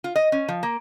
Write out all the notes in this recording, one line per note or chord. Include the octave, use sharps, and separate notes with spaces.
F4
D#5
C#4
F3
A#3